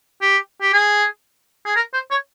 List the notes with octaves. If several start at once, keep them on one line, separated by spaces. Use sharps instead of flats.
G4
G4
G#4
G#4
A#4
C5
C#5